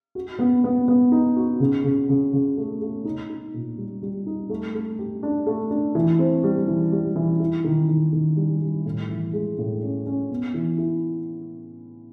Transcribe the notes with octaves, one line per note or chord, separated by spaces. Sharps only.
F#4
B3
B3
B3
D#4
F#4
C#3
C#3
C#3
C#3
A3
A3
D#4
D#4
A#2
G3
G3
D#4
A3
A3
G4
D4
A3
D4
E3
C4
G3
E3
G3
E3
E4
D#3
D#3
D#3
G3
G3
A2
E3
G#3
A2
C#4
C#4
B3
E3
E4